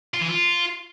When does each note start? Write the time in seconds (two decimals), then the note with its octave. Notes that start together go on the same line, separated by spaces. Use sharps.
0.14 F4
0.21 E3
0.29 F4